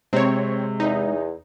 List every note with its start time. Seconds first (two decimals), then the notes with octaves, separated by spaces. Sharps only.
0.13 C3 G#3 C4 C#5
0.80 E2 D#4